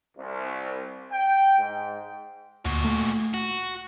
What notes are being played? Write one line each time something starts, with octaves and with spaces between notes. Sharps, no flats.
C2
G5
G#2
D2 A#2 F#4
A3
F#4